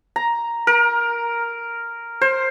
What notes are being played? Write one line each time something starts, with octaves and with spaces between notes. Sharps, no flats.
A#5
A#4
C5